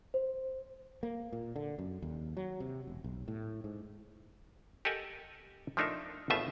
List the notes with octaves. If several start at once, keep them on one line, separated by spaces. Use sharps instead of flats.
C5
A#3
A#2
D3
F#2
D#2
F#3
C3
E1
B1
A2
G#2
G4 A4 A#4 D#5 F#5 G#5
F3 A3 D4 D#4 A#4 E5
G#1 B2 A3 F4 E5 G#5